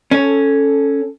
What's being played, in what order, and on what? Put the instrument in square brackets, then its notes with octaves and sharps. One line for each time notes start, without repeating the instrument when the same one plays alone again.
[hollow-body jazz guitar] C#4 [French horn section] A4